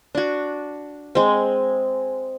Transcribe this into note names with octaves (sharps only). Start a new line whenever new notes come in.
D4 F#4
G#3 C4